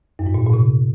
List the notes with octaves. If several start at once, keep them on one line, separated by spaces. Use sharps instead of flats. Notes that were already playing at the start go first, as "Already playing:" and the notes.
F#2
G#2
A#2
A#2
C3